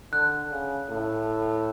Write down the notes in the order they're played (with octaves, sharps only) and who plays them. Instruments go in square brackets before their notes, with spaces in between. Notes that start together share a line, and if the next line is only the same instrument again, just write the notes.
[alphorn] D3 [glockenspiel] F#6
[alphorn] C#3
A2